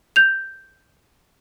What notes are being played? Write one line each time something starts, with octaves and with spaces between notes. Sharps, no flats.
G6 F7